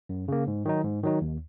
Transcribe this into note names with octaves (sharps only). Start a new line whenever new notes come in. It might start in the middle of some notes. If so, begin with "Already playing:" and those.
F#2
C#3 A#3
G#2
D#3 F#3 D#4
G#2
D#3 F#3 D#4
D#2